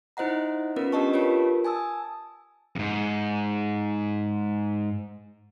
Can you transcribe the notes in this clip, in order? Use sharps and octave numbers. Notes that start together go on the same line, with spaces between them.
D#4 E4 C5 D#5 F#5 A#5
B3 C#4 F4 A#4 B4
D4 G4 A#4 D#5 A5 C#6
F4 G4 A#4 B4 C#5
G#5 A5 D#6 E6
F2 G#2